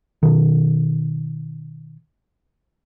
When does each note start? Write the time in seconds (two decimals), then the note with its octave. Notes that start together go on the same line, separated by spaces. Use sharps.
0.23 B2 D#3